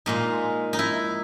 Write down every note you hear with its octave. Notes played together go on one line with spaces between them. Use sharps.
A#2 G#3 D#4
D#4
E4